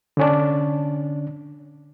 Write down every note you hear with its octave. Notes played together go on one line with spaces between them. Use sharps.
D3 C#4 D4